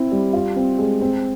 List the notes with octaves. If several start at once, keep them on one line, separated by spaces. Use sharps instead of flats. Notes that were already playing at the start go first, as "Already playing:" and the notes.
Already playing: C4 E4
G3
F4
C4
G#3
C4